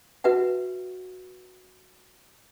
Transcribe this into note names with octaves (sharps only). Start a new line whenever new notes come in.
F#4 B4 E5 F#5